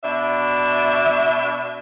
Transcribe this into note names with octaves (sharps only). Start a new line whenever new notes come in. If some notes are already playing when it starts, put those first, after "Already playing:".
B2 D4 E5